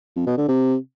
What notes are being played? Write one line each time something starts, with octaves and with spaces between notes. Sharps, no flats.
F2
B2
D3
C3